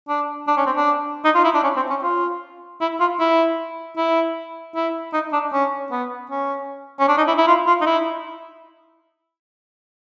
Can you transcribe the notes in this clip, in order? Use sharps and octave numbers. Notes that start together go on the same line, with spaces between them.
D4
D4
C#4
C4
D4
D#4
F4
E4
D4
C#4
C4
C#4
F4
E4
F4
E4
E4
E4
D#4
D4
C#4
B3
C#4
C#4
D4
D#4
E4
E4
F4
F4
D#4
E4